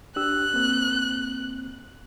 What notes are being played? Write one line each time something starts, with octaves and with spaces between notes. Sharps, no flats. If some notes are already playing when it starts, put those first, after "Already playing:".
D4 G4 E6 F#6
A#3 C4